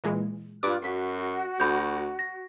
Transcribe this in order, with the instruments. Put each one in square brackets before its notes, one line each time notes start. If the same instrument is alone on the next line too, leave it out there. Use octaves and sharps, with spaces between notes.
[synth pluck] A#2 E3 G#3
[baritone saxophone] G2 [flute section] F4 F#6 [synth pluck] D6
[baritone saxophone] F#2 [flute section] F#4 [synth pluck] B6
[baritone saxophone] D2 [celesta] B5 G6
[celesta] A#6